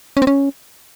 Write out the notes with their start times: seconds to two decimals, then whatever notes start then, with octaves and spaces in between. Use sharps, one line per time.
0.17 C#4
0.22 C4
0.27 C#4